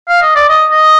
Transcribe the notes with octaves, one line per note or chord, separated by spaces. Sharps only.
F5
D#5
D5
D#5
D#5